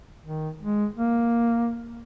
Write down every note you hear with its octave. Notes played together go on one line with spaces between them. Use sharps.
D#3
G#3
A#3